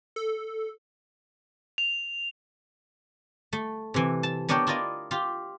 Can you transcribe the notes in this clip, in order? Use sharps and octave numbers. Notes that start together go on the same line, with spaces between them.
A4
F7
A3
C3 E3
A5
B3 D4 A#4 C#5 G5
E4 F4 A#4 D5 D#5
F4 G4